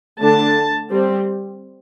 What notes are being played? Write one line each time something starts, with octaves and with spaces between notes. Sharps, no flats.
D3 A3 D4 A5
G3 C4